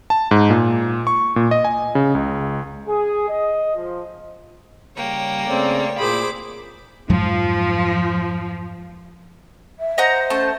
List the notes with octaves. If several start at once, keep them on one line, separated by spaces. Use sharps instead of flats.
A5
G#2
A#2
C#6
A#2
D#5
G#5
C#3
C#2
G#4
D#5
F3
C#3 G3 A#3 C#5 G5
C#3 A3 C4 D5
A#2 E4 G#4 C5 B5 D6
F2 G#2 F3 F#3
E5
C5 D#5 F#5 A#5
A3 C#4 A5